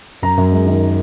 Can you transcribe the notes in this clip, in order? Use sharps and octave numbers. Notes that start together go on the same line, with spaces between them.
F#2 A#5
F#2
G#3
D#3